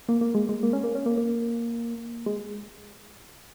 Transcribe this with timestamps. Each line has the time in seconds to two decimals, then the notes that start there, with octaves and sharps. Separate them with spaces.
0.09 A#3
0.21 A#3
0.35 G#3
0.49 G#3
0.63 A#3
0.73 C#4
0.84 A#3
0.95 C#4
1.06 A#3
1.17 A#3
2.26 G#3